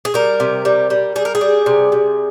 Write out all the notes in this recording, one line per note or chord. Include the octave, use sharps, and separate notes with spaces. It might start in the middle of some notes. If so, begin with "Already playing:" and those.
G#4
G3 A#4
C3
G3
G3
G3 G#4
A#4
G#4
G3
C3
C3